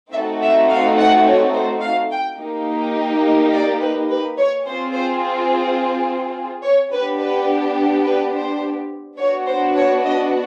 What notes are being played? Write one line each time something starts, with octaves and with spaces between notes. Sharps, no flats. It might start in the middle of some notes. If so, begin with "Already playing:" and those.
A3 C4 D#4 F#4 A4 E5
E5
F5
F#5
C#5
C5
F5
G5
A#3 D#4 G4
D5
B4
B4
C#5
C4 F4 G#4 C5
C5
C#5
B3 D4 G4 B4
B4
B4
C5
B3 D4 F#4 C#5
C5
C#5
D#5